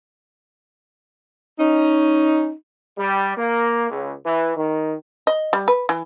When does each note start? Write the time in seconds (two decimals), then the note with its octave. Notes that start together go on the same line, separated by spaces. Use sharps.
1.59 C#4 D#4
2.97 G3
3.36 A#3
3.90 C#2
4.25 E3
4.56 D#3
5.27 D#5
5.53 G3
5.68 B4
5.89 E3